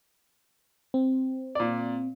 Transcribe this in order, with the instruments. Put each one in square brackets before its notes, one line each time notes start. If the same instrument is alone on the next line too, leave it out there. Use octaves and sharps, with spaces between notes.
[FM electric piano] C4
[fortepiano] A#2 D5